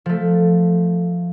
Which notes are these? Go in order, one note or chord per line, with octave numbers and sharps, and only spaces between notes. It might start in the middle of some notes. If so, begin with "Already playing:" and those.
F3 A3